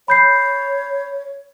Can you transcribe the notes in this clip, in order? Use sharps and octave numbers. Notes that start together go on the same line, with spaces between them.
C#5 B5 G6 C7